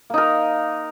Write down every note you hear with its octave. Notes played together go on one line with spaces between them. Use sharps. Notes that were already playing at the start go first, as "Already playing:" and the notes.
A#3 D#4 A#4